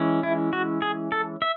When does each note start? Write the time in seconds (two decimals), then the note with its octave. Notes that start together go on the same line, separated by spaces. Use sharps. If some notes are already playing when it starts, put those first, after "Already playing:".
Already playing: E3 G#3 C#4
0.23 E4
0.53 F#4
0.82 G#4
1.12 A4
1.42 E5